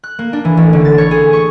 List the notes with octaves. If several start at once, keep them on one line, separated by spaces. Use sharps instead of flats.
F#6
A#3
D4
E3
A1
D3
A6
C#5
G#4
C#6